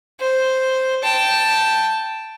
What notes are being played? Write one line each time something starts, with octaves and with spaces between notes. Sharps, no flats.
C5
G5 A5